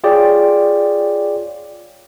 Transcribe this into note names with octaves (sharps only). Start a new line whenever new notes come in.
F4 G#4 C#5 D5 G5